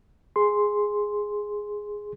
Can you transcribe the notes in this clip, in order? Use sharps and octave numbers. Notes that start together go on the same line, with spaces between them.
G#4 C6